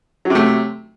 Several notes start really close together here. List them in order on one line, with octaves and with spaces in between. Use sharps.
F#3 C3 A3